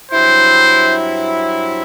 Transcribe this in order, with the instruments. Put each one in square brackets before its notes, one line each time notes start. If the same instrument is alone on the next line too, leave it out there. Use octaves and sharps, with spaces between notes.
[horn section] G2 F#3 C4 E4 [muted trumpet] C5